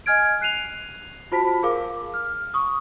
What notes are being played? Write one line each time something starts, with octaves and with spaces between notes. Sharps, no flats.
D#5 G#5 F6 G#6 D7
F#6 C7 D#7 F7
F4 F#4 C5 A5 B5 B6
G#4 A#4 F5 D6
F6
C#6 D#6